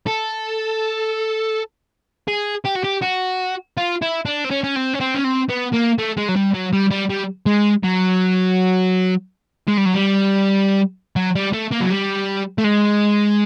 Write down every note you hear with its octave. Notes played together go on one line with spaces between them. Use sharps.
A4
G#4
G4
F#4
G4
F#4
F4
E4
D4
C4
C#4
C#4
C4
C#4
C4
C#4
C4
B3
A#3
A3
G#3
F#3
G3
F#3
G3
G3
G3
G#3
F#3
G#3
G3
F#3
G3
F#3
G3
A3
A#3
F#3
G3
A3
G#3